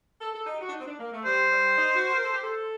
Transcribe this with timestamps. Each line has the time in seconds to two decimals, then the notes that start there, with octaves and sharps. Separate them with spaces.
0.20 A4
0.34 A4
0.46 D#4
0.54 G4
0.60 F#4
0.68 D4
0.73 D#4
0.80 C4
0.86 D4
0.99 A#3
1.12 A3
1.25 G3 C5
1.52 G3
1.77 D#4
1.95 F#4
2.13 A#4
2.23 A4
2.33 G4
2.43 A4